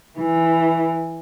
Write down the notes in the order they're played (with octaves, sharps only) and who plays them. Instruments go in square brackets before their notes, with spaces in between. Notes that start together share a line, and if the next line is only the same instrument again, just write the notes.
[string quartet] E3